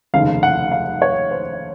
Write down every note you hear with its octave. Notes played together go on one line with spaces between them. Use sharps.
F1 D#2 C#3 F5
F#5
F5
C#5
C5